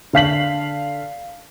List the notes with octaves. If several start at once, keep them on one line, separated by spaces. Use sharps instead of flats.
D3 F5 B6 F#7